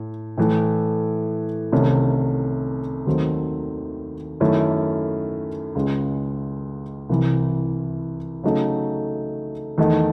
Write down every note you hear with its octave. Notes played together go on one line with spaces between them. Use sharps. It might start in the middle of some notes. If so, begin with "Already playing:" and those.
Already playing: A2
A2 E3 A3
C2 C3 D#3 A3 C#4
D#2 D#3 F#3 A3 C4
F#2 D#3 A3 C#4 E4
C#2 C#3 G#3
C2 C3 E3
C#3 F#3 A3 D#4
E2 D#3 A3 D#4